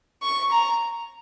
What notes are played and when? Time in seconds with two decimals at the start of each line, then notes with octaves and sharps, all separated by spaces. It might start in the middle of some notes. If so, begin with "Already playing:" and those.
0.22 C#6
0.51 A#5